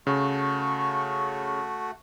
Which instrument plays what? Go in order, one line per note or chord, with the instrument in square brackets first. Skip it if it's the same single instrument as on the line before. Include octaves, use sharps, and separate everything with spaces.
[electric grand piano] C#3 [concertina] A3 F#4 [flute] C#6